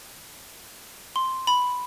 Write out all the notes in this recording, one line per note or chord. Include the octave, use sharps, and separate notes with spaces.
C6
B5